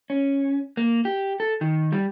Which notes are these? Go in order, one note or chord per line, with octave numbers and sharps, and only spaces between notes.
C#4
A#3
G4
A4
D#3
G3